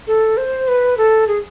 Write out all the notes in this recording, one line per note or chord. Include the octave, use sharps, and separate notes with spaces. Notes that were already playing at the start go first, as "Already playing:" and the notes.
A4
C5
B4
A4
G#4